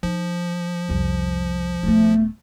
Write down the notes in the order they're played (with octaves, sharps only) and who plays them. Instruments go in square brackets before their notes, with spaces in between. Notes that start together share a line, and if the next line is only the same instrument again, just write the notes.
[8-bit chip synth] F3 [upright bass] D#4
[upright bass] C2 F2
[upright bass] D#1 B3 [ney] A3